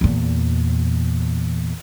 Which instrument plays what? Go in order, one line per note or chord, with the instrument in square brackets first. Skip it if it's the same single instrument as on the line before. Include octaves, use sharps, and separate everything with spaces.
[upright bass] E2 A#2